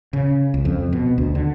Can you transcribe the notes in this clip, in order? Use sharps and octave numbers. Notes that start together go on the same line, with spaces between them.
C#3
C#2
F2
B2
D2
D3